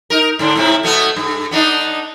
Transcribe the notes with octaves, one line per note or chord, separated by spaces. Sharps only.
D#4 A#4
G#2 D3 D4
G#2 C3 E4
B2 A3 B3
G2
B3 D4 D#4